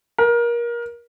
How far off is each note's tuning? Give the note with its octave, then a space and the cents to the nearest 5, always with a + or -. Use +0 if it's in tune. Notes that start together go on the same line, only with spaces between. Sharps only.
A#4 +25